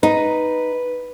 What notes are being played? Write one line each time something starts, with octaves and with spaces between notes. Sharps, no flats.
D#4 B4